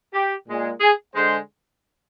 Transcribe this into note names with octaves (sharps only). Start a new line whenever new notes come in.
G4
A#2 G#3
G#4
D3 G#3 C5